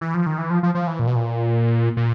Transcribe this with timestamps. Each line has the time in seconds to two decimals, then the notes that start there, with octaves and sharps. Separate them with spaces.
0.01 E3
0.14 F3
0.26 D#3
0.38 E3
0.50 F3
0.63 F3
0.75 F3
0.87 E3
0.99 A#2
1.07 B2
1.15 A#2
1.97 A#2